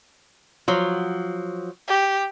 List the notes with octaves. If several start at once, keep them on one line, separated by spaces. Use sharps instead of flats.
F3 F#3
G4